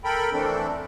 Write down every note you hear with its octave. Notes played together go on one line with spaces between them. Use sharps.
A4 A#4 G5 B5
E3 A3 C4 D4 A4